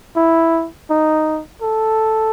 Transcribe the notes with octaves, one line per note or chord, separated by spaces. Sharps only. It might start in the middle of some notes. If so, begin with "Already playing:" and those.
E4
D#4
A4